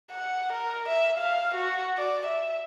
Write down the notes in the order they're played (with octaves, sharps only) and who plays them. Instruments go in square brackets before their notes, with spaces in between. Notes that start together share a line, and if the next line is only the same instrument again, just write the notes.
[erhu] F#5
A#4
E5
F5
F#4
D5
E5